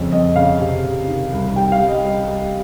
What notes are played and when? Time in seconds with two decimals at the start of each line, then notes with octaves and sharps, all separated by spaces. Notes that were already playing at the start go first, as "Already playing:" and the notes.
Already playing: F2 C#3
0.12 F2 D#5
0.36 C#3 F5
0.60 C3
0.84 C3
1.08 D#3
1.32 C2
1.56 G3 G5
1.72 F5
1.80 G3
1.88 D#5
2.04 G3
2.28 G3